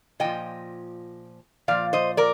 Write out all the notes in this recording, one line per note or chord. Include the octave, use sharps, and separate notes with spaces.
A#2 F3 D#5 G5
A#2 F3 D5 F5
C5 D#5
A#4 D5